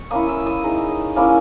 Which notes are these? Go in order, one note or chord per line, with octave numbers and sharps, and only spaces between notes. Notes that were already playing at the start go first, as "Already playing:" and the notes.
Already playing: C#6
A#3 C#4 E4 D#6
E6
D#6
G#3 D#4
A#3 C#4 E4